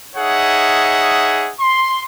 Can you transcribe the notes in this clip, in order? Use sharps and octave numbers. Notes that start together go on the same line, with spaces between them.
D#4 G#4 C#5 E5 F#5
C6